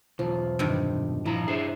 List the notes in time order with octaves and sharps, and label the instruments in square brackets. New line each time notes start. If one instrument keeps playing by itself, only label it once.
[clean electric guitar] B1 E2 [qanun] F3
[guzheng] G2 C3 D#3
[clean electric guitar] A#2 F3 A#5 [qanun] E4
[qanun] D4 [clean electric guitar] G#4 C5 E5